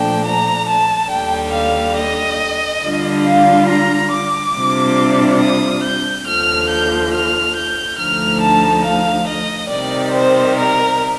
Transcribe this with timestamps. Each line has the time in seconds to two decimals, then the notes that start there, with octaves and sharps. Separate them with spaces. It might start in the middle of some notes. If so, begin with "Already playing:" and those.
Already playing: A#2 F3 A3 D4 G5
0.26 A#5
0.69 A5
1.11 D#2 D3 G3 G5
1.54 F5
1.98 D#5
2.84 D3 G3 D4 F4
3.25 F5
3.68 A#5
4.12 D6
4.55 C3 G3 D4 F4
5.40 D#6
5.84 G6
6.26 D#2 D3 F3 F6
6.69 G6
7.13 F6
7.56 G6
7.98 D2 D3 F3 A3 D#4 F6
8.41 A5
8.84 F5
9.27 D#5
9.70 C3 D#3 G3 D5
10.13 C5
10.56 A#4